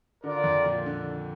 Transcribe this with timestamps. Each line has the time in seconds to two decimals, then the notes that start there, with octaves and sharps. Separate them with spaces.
0.23 D3 F4 A#4 D5
0.44 F2
0.65 A#2
0.86 D3